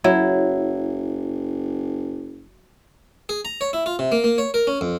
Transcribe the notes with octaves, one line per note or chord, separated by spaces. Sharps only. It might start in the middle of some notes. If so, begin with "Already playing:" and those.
F#1 F#3 E4
G#4
A#5
C#5
E4
F4
C3
A#3
A#3
C#5
A#4
C#4
F2